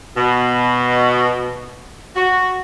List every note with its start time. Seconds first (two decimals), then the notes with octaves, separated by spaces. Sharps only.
0.16 B2
2.16 F#4